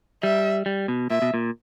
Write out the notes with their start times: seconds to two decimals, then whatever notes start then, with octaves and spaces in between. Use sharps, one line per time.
0.23 G3 E5
0.66 G3
0.88 B2
1.10 A#2 E5
1.22 B2
1.34 A#2